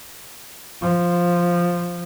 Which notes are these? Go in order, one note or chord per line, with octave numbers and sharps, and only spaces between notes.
F3